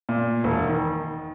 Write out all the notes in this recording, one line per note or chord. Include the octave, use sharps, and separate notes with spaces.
A#2
E1
D#3